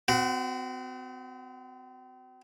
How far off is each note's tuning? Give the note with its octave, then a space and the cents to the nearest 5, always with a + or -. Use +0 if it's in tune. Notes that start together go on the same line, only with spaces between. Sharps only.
C4 -40 F#4 +0